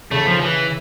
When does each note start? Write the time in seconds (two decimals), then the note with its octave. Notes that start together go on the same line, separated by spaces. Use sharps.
0.12 C#3 A3
0.26 F3
0.41 E3